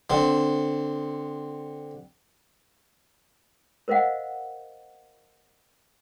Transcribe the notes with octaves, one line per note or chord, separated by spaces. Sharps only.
D3 C4
A#4 C5 D#5 F5 F#5